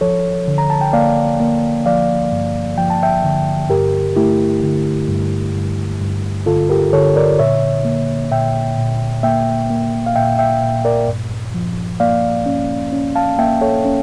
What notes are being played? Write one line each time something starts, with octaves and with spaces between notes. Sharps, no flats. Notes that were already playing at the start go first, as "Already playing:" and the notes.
F3 A4 C#5
D3
A#5
A5
G5
A#3 D5 F5
A#3
F3 D5 F5
G2
F3 G5
A5
E5 G5
D3
G2 G4 A#4
A3 E4 G4
D3
G2
G2
G2
D3 F4 A4
G4 A#4
D3 A4 C#5
A#4 D5
A#2 C#5 E5
A#3
A#2 E5 G5
A#2
A#3 E5 G5
A#3
F5
A#2 E5 G5
E5 G5
A#2
A#4 D5
G2
F3
A#3 D5 F5
C#4
C#4
F5 A5
A#3 E5 G5
A4 C#5
C#4